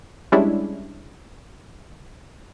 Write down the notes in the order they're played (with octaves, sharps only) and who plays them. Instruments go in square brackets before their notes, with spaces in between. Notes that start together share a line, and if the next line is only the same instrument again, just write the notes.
[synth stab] G3 G#3 C#4 D4 E4